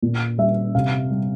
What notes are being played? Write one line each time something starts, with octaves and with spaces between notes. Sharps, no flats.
A#2
G3 E5
C3 F5
G3